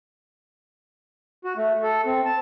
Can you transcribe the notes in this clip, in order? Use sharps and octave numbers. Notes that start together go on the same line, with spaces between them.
F#4
A3
A4
C4
A5